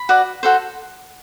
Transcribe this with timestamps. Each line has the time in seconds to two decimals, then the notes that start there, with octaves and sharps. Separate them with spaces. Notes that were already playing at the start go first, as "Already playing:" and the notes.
Already playing: B5
0.09 F#4 B4 D5
0.43 F#4 A4 C5